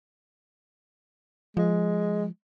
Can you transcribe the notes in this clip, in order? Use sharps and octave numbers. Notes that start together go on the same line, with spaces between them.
F3 G#3